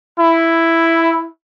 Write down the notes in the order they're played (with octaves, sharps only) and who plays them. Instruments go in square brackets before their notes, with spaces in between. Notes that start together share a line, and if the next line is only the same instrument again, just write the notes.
[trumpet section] E4